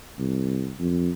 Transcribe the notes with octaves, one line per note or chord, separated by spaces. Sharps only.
C2
F2